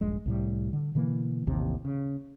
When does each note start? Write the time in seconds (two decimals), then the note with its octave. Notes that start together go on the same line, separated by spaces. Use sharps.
0.01 D#1 A#1 G2 G#3
0.26 C2 A2 G3
0.73 D3
0.95 B2 D3 E3 A#3
1.47 A1 D#2 C3 E3
1.85 C#3